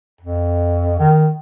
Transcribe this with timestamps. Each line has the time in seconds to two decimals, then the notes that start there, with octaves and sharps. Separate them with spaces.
0.21 F2
0.99 D#3